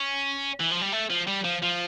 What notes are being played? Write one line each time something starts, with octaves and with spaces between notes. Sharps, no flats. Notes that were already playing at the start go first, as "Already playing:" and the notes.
Already playing: C#4
E3
F3
G3
A3
F3
G3
F3
F3